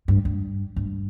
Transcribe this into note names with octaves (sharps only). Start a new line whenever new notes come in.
G2
G2
G2